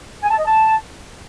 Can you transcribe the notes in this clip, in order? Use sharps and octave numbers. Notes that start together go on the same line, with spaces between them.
G#5
A5
D#5
A5